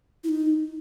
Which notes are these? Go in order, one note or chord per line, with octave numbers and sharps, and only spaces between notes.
E4
D#4